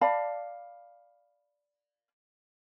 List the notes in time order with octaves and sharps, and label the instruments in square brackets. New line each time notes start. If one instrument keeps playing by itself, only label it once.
[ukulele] D5 F5 A5 B5